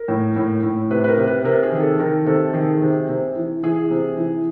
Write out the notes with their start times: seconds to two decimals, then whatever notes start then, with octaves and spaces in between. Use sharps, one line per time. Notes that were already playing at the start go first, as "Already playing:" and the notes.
Already playing: A#4
0.08 A2
0.36 A2
0.63 A2
0.91 C3 B4
1.04 B4
1.08 A#4
1.18 C3
1.27 B4
1.44 C3 A#4
1.63 G#4
1.72 D#3
1.81 A4
1.99 D#3 A#4
2.26 C3 A4
2.53 D#3 G#4
2.82 C3
3.09 C3
3.36 E3
3.63 E3 G#4
3.91 C3
4.17 E3